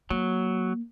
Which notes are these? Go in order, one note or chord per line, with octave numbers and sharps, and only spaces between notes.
F#3 A#3